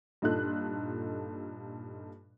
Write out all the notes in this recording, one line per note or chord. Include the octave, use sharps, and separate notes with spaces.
G2 A#2 D#4 F4 A4 F#6